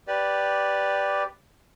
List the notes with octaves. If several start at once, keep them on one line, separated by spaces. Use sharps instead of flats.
G4 B4 D5